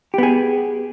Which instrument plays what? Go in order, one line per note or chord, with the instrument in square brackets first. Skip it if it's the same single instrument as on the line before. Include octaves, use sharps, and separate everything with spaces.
[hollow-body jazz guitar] G4
B3
G#4